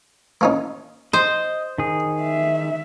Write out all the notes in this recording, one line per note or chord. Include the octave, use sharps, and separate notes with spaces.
A#3 C#4 D#4
C5 D#5
D#3 G#4
E5